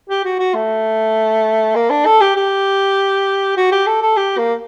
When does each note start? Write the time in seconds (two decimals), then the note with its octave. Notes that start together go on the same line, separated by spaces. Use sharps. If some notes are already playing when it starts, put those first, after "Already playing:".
0.09 G4
0.25 F#4
0.39 F#4
0.54 A3
1.75 A#3
1.90 D4
2.06 A4
2.21 G4
2.36 G4
3.57 F#4
3.72 G4
3.87 A4
4.02 A4
4.17 G4
4.38 A#3